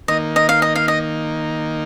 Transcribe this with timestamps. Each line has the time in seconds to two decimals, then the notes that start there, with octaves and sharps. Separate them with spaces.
0.08 D#3 A#3 D#4 D#5
0.36 D#5
0.49 F5
0.62 D#5
0.76 F5
0.88 D#5